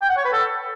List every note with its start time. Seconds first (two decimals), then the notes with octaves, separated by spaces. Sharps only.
0.02 G5
0.09 F#5
0.17 C#5
0.25 B4
0.32 A4